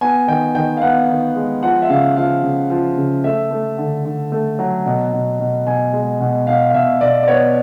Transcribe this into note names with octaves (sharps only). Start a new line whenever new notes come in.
B3 G#5
D#3 G5
D#3 G5
F5
B3 F#5
D#3
G#3
F3 F#5
E5
C#3 F5
F3 F5
C#3
F3
C#3
A3 E5
A3
D3
D3
A3
F#3
B2
B2
B2
B2 G#5
G#3
B2
B2 F5
F5
B2 E5
B2 D5
D5
B3 C#5